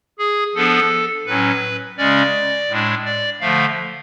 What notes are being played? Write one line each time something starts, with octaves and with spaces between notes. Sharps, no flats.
G#4
F3 B3 D4 A4
A2 F#3 C#4 B4
C#3 G#3 C#4 D5
A2 G#3 D4
D5
D3 F3 A3 F5